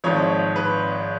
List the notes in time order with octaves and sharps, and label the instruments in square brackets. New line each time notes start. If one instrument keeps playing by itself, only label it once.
[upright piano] G#1 G#2 F3 C#5
B4